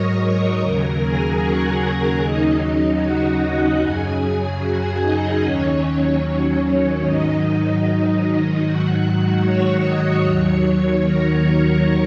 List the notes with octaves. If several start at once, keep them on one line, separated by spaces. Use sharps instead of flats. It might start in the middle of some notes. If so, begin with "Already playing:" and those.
Already playing: G#2 F#3 A#4 C#5 D#5 A#5 C#6 D#6
D#2 C#3 F#3 A#4 A#5
G#4 G#5
F#4 F#5
D#2 C#3 F#3 D#4 D#5
F#4 F#5
F#2 C#3 F#3 G#4 G#5
G#4 G#5
F#4 F#5
D#4 D#5
D#2 D#3 F#3 C#4 C#5
G#2 D#3 F#3 D#4 D#5
G#2 D#3 F#3 F#4 F#5
C#5 C#6
D#5 D#6
D#2 D#3 F#3 C#5 C#6
A#4 A#5